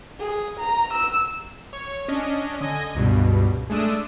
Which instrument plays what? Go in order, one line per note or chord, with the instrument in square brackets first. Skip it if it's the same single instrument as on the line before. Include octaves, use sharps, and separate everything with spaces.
[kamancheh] G#4
A#5
E6
[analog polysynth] C#5 C#6
C#4 D4 D#5
D3 D#5 G#5 A#6
C#2 G2 B2
G#3 A3 D4 D#6 E6